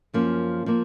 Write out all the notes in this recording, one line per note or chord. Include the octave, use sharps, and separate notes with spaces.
F#2 F3 A#3 C#4
F3 A#3